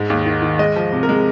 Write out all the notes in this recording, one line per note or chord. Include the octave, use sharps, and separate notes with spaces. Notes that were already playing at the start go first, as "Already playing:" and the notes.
Already playing: G#2 G#3
D#2
D#3
D#3
G#3 D#5
F3
C3
A#4
G#3